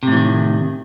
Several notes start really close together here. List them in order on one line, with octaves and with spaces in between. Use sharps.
C3 A2 E3 D#3